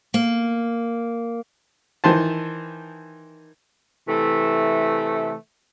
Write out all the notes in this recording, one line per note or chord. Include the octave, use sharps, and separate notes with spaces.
A#3
D#3 E3 C5 A5
C3 E3 A3